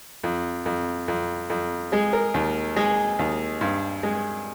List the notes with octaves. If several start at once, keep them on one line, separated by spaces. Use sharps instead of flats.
F2
F2
F2
F2
G#3 G#4
A#4
D#2
G#3 G#4
D#2
G2
G#3